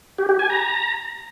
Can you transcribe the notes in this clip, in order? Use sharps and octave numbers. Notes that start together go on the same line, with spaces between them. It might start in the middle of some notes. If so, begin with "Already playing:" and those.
G4
G4
G#5
A#5